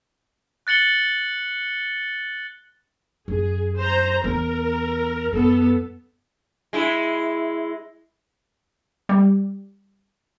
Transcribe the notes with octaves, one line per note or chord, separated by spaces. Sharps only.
F#6 A6 C#7 F#7 G7
F#2 G#4
C5 A#5
E2 A#4
F#2 B3 A4
G#3 E4
G3